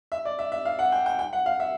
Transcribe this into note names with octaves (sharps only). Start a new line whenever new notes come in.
E5
D5
E5
E5
F5
F#5
G5
G5
G5
F#5
F5
E5